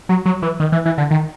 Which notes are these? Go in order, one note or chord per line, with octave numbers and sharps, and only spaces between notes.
F#3
F#3
E3
D#3
E3
E3
D3
D#3